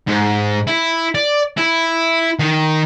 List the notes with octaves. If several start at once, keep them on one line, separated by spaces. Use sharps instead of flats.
G#2
E4
D5
E4
D#3